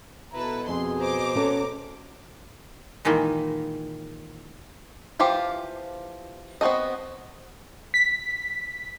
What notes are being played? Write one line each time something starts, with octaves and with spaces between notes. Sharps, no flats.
B2 E4 A4 B4 A#5
F2 G#4 C6
C5 A#5 D6
B3 C#4 A4
A#2 D#3 E3 G#3 A#3
E3 F3 F4 G4
B3 C4 F#4 A4 D#5
B6